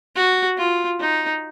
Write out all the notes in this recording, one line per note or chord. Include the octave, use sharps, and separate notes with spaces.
F#4
F4
D#4